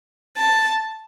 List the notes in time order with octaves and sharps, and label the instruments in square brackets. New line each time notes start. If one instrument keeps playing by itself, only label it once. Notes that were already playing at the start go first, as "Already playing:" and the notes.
[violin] A5